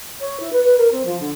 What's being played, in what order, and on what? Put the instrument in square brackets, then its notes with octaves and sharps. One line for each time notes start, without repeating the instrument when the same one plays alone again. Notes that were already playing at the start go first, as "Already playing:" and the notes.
[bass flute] C#5
E4
B4
B4
A#4
C4
F3
D3